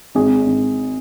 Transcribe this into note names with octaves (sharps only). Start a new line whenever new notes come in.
G#1 G#4
G#1